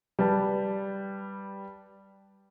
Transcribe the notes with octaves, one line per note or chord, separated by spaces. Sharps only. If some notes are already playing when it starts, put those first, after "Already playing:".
G3 B4 A5